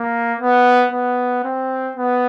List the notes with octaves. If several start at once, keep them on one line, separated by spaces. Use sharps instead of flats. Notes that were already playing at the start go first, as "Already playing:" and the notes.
Already playing: A#3
B3
B3
C4
B3